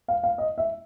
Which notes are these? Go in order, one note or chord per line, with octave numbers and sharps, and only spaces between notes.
F5
F5
D#5
E5